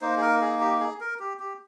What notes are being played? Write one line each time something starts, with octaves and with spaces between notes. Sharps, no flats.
A#3 D#4 C5
G#4
A#4
G#4
G4
G#4
A#4
G4
G4